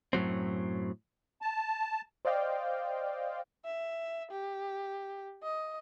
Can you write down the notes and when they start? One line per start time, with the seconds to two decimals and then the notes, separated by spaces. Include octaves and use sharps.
0.13 F#2 A2 F#3 C4
1.42 A5
2.25 C5 D5 D#5 F5 G5
3.65 E5
4.31 G4
5.43 D#5